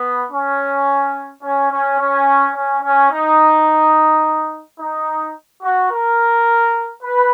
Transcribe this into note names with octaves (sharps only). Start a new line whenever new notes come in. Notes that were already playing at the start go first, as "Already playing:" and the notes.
Already playing: B3
C#4
C#4
C#4
C#4
C#4
C#4
D#4
D#4
F#4
A#4
B4